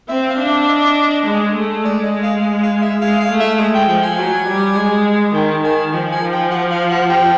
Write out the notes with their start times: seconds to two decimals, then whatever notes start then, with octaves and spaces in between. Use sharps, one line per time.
0.09 C4 E5
0.29 F5
0.38 D4
0.48 E5
0.68 D#5
1.26 G#3
1.55 A3
1.84 G#3 D5
2.03 D#5
2.23 F5
2.63 F5
2.82 E5
3.01 G#3 F5
3.20 F5
3.31 A3
3.40 E5
3.59 G#3
3.75 G5
3.89 F3 G5
4.03 G#5
4.18 F#3
4.47 G3
4.76 G#3
5.34 D#3 G5
5.63 D#3 G#5
5.92 F3 G5
6.12 G#5
6.32 G5
6.51 F#5
6.71 F5
6.91 F#5
7.10 G5